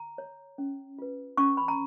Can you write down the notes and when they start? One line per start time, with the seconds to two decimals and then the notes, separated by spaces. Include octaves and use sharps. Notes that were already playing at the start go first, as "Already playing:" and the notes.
Already playing: A#5
0.18 C#5
0.58 C#4
0.98 F4 B4
1.37 C#4 C#6
1.57 B5
1.68 A#5